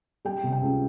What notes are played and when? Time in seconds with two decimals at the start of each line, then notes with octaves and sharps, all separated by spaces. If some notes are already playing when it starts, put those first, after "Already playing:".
0.25 G3 G5
0.43 C3
0.52 G5
0.62 C#2